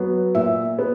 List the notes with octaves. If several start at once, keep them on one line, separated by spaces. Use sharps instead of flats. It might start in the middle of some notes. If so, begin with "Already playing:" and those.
Already playing: F#3 B3
A#2 E5
B3